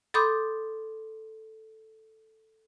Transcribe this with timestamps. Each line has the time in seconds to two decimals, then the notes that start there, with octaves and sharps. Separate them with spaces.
0.14 A4 B5 C6 D6 D#6 G6